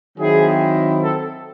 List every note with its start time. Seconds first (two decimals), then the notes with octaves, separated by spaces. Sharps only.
0.18 D#3 F#3 C4 E4 G#4
1.04 A4